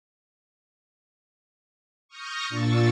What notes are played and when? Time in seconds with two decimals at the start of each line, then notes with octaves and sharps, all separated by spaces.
2.08 C#6 D#6 F6 G6 A#6
2.49 A#2 D4 F4 C#6 E6 A6